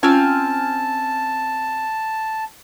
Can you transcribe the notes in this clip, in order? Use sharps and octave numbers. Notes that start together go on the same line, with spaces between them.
C4 C#4 F4 F5 G#5 A5